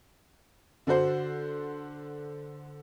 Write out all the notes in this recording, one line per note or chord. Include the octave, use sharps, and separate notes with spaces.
D3 D4 F#4 C5